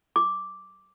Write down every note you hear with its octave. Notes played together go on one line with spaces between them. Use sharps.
D6